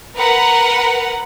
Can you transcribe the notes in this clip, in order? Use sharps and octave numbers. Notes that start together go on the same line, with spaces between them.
A#4 B4 F#5